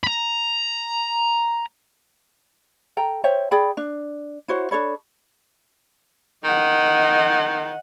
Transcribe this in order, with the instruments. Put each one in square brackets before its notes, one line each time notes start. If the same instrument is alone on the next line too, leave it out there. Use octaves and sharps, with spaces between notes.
[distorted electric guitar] A#5 B5
[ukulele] A4 G5 A#5
C5 C#5 E5 G5
G#4 D5 G5 B5
D4
E4 F#4 C5 C#5
D4 A4 C#5 B5
[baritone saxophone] D#3 [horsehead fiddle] D#5 F#5